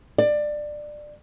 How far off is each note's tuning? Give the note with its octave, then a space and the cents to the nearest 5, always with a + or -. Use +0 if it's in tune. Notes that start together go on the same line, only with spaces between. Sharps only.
D5 +20